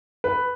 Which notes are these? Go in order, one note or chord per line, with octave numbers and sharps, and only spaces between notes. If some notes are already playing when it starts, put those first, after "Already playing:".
B4